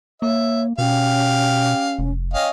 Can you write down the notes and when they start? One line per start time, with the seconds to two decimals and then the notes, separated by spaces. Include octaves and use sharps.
0.22 A#3 C#5 E5
0.78 B2 C#4 G4 F5
1.99 F1
2.34 C#4 D#5 F5 G5